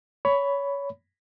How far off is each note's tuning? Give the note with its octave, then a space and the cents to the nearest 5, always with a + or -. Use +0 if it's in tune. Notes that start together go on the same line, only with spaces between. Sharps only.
C#5 +20 B5 +0